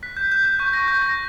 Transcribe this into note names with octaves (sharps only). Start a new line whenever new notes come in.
F#6 B6
G6
F#6 G6
G6
C#6 G6
A#6
C#6 G6
A#6